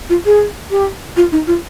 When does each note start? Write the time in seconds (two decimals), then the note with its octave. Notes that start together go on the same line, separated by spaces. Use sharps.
0.09 F4
0.25 G#4
0.70 G4
1.16 F4
1.32 D#4
1.47 F4